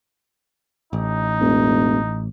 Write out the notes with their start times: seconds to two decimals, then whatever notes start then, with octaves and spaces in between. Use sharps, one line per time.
0.93 A1 D#4
1.40 E1